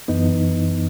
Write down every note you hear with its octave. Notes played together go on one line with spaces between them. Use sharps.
F#2 E3 B3 D#4